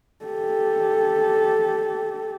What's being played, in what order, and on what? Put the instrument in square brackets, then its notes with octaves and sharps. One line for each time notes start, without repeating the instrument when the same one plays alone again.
[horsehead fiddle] G4 A4